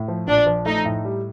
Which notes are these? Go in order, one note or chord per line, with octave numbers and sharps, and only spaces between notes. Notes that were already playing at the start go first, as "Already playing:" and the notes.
Already playing: A2
F3
A#1 D4
F3
A3 D#4
A2
G3